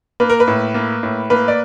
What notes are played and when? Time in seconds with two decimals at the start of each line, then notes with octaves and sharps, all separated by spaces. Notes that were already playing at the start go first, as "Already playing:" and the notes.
0.20 A#3 B4
0.30 A#4
0.40 B4
0.48 A2
0.74 A#3
1.03 A2
1.30 A#3 B4
1.48 D5